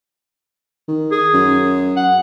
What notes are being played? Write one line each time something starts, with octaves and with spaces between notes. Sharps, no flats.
D#3
G#4
F#2
F#5